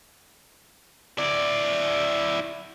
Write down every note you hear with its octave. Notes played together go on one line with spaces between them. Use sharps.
E4 D5